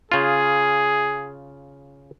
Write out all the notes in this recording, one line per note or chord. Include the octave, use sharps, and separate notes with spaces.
C#3 F4 G#4